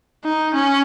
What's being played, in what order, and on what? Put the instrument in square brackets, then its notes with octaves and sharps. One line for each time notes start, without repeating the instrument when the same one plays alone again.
[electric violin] D#4
C#4